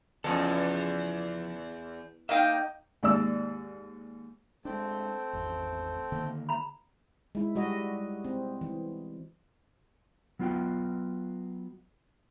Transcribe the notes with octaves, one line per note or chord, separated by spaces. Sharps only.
E2 C#3 F3 A4
A#3 D#4 E5 F5 G5
D#2 G#2 D5 E6
G#3 A3 C4 D4 G5
G#1 E2
D3 D#3 A#3
A#5 B5
G#3 E4
G3 F#4 D#5
C4
E3
F#3 B3 F4 F#4 G5